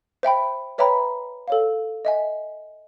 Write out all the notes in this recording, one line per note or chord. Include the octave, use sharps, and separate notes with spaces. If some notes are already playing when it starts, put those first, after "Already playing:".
C5 E5 G5 B5
B4 C#5 E5 G5 A#5 B5
A4 C#5 F5
D#5 E5 G#5